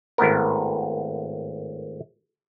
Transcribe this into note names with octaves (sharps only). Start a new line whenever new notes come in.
G#1 A2 B3 A#4